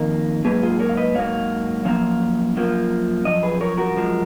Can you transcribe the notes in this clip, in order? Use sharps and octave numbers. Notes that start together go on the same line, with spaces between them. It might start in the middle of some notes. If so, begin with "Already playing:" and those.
Already playing: F2 D#3 A#3 A#4
G#2 F#3 A#3 G#4 B4
F4 G#4
A#4 C#5
F5
B4 D#5
G#2 F#3 A#3 C#5 F5
F#2 F3 A#3 C#5 F5
F#2 F3 A#3
F#2 F3 D#5
G#4 B4
A#4 C#5
F#4 A#4
F#2 F3 G#3